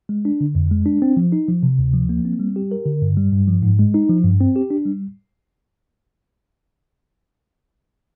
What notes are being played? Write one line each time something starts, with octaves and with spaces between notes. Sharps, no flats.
G#3
D4
D3
F2
G#3
D4
C4
F3
D#4
F3
C3
D2
F3
A#3
C4
G3
G4
A#4
D3
G2
G3
G2
F3
G#2
G#3
D#4
F3
G2
C4
G4
D4
G3